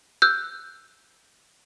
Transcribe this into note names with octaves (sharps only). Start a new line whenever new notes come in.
E6 F#6 G6